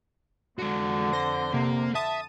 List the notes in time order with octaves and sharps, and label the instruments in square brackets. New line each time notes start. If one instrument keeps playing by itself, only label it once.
[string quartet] F2 D3 [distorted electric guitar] G#3 F#4
[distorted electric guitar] C5 [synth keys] A#6
[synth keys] C3 [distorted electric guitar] A#3
[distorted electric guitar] E5 [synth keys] A5 D#6 D#7